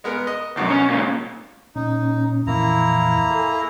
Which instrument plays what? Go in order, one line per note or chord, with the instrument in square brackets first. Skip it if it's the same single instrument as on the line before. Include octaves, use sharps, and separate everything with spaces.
[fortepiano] G#3 B3 A#4
D#5
[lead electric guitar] C2 F#2 [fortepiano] B2
[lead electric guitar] C#4
C#2 A#2
[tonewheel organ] A#2 C#4 [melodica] D#4
[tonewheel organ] F2 A#2 E3 [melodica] A#3 E4 A#5
[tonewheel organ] A4 G#5 C6